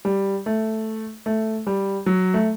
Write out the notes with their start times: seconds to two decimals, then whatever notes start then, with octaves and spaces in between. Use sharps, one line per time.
0.05 G3
0.46 A3
1.26 A3
1.67 G3
2.06 F#3
2.34 A3